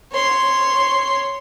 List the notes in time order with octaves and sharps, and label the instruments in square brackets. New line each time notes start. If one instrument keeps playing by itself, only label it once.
[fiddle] C#5 C6